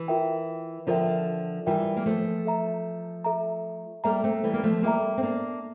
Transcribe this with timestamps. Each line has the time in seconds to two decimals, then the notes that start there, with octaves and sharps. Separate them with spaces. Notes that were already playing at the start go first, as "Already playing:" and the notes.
Already playing: E3
0.08 F4 A#4 E5 G5
0.87 D3 F3 F4 A#4 E5 G5
1.66 E3 G3 F4 A#4 E5 G5
1.97 A#3
2.06 F3 A3
2.45 A4 E5 A#5
3.24 A4 E5 A#5
4.04 G3 A#3 A4 E5 A#5
4.24 A3 C4
4.44 E3 G3
4.53 A#3
4.63 F3 A3
4.83 G3 A#3 A4 E5 A#5
5.18 C4
5.23 A#3 D4